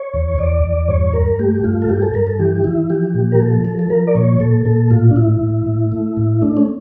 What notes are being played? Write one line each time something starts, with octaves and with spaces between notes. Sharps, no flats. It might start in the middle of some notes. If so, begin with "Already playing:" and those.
Already playing: C#5
E2
E2 D5
E2
G2 C#5
G2 A#4
A3 G4
G2 F4
A4
G2 G4
A4
G2 A#4
A4
E3 G4
E3 E4
F3 G4
A#2
A#4
F3 A4
F3 A4
A4
F3 A#4
D5
A#2 C#5
A#2 A4
A#2 A4
A2 F4
D4
A2 E4
A2
A2
A3
A2
A3 D4
C#4